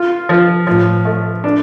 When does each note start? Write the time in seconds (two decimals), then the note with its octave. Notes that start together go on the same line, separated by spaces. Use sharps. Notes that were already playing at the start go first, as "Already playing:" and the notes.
Already playing: F4
0.29 F3
0.67 A2 F3
1.05 A3
1.44 D4